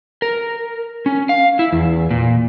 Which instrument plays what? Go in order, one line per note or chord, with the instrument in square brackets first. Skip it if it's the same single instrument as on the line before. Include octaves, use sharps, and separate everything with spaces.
[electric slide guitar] A#4
C#4
F5
E4
E2
A#2